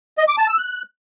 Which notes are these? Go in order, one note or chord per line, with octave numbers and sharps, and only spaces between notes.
D#5
D6
A5
E6
F#6